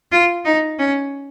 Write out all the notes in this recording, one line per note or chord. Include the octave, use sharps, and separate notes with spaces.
F4
D#4
C#4